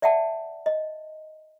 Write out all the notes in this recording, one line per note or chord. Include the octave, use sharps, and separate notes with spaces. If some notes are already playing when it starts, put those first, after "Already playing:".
D5 E5 F#5 G5 A5
D#5